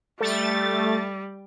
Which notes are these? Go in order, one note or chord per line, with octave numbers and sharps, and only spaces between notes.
G3 A3 A6